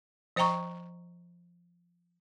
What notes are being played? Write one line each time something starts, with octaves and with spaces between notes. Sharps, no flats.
F3 C5 D#5 G5 A#5 C#6